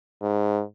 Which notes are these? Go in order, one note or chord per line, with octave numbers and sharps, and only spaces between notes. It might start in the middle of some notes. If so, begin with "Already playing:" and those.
G#2